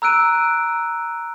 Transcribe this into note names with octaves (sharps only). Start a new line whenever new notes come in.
A#5 E6 F#6 D7 D#7